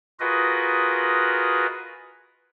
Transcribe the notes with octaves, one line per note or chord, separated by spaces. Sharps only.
F4 F#4 G#4 A#4 B4 D#5